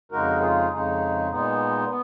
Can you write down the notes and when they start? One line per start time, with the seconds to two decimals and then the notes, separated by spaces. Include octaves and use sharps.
0.12 F2 C#3 G#3 D#4 F#4 A#4
0.41 F4 G#4
0.71 F2 C#3 G#3 D#4
1.30 A#2 G#3 B3 D#4
1.88 B3